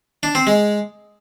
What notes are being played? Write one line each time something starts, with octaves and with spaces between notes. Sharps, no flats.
D4
C4
G#3